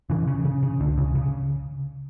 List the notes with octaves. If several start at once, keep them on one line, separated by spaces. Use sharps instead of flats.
C#3 E3
C#3
C#3
C#3
C#2 D3
C#3
C#3